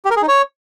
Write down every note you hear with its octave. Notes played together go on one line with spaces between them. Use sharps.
G4
A#4
G#4
D#4
C#5